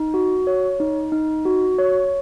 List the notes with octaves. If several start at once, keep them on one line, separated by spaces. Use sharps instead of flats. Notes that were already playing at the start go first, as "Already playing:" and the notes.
Already playing: D#4
F#4
C#5
D#4
D#4
F#4
C#5